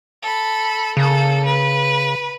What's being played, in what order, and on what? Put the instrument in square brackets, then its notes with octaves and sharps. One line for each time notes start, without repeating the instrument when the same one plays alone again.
[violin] A4 B5
[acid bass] C#3 [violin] A#3 A4
[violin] B4